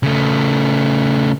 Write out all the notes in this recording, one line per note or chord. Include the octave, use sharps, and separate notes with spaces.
C#3 A3